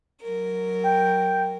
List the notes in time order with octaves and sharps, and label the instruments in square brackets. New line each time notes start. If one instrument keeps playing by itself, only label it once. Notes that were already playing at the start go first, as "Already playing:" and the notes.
[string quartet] F#3 A#4
[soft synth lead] G5